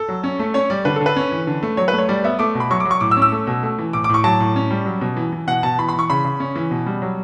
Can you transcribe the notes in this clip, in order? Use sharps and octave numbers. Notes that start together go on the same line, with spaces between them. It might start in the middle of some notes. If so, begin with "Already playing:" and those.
Already playing: A4
F#3
C#4
A3
C#4 C#5
G3 D5
D3 B4
A4
D3
B4
C#4
E3
D3
A3
F#3 C#5
B4
A3
C#5
G3 D5
B3 E5
A3 D6
B2
B5
F#3 C#6
D6
F#3
C#6
A2 D6
E6
C#4
E6
A3
B2
A3
E3
A2 D6
D6
A2 C#6
F#3 A5
A2
C#4
G3
F#3
B2
E3
E3
B2 F#5
B2 A5
E3 B5
B5
E3
C#6
C#3 B5
C#3
C#4
E3
B2
G3
F#3